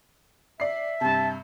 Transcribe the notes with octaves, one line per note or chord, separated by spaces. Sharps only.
D5 E5 C7
G2 C3 A5